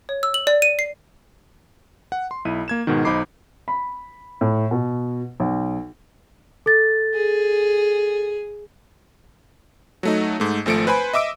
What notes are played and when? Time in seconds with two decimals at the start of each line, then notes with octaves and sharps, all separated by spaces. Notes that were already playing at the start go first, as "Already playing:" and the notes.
0.09 C#5
0.23 E6
0.34 F#7
0.47 D5
0.62 D#7
0.79 C7
2.12 F#5
2.31 C6
2.45 B1 E4 D#7
2.68 A#3 G#6 E7
2.87 G#2 B2 D#3
3.05 B1 D#4 C5 B5 D6 C7
3.68 B5
4.41 A2
4.71 B2
5.40 B1
6.66 A4 A6
7.14 G#4
10.03 F#3 A3 D#4
10.40 G#2 A3
10.66 G#1 F3 A3 C#7 D7
10.87 B4 C5 G#5 B5
11.13 D#5 E5 D6 E6 D7